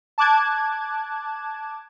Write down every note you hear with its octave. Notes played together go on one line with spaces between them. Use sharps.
A5 D6 F#6 G#6